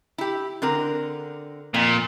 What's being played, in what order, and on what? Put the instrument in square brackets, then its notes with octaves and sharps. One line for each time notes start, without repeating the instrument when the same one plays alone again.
[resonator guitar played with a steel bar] E4 G4
D3 C4 A#4
[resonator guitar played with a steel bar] F2 [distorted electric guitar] A#2